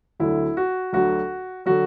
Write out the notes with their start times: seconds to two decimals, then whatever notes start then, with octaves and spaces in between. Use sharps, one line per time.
0.20 D2 D3 F#3 E4
0.57 F#4
0.93 D2 D3 F#3 F#4
1.66 D3 F#3 F#4